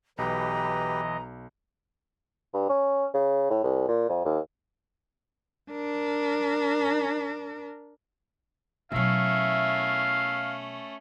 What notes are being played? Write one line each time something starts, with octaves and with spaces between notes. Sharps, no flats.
B1 E3 G4 B4 D#5 A#5
G2
C#4
C#3
A2
C2
A#2
F2
D#2
D4 A#4
B2 F#3 A3 C#4 E4 A#4 E5 F5